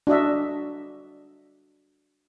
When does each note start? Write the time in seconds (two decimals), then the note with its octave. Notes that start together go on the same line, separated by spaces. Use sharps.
0.07 D4 F#4 D#5 E5